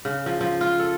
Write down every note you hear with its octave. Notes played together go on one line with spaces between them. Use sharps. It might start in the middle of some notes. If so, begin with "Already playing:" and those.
C#3
F3
F3
F4
A4